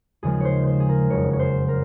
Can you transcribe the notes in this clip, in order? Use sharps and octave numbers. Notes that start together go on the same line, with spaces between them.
D#2 C#3 F3 G#3 G#4
C5 C#5
C5
G#4
A#4
F#1 F2 C#3 C#5
C#5
C5
A#4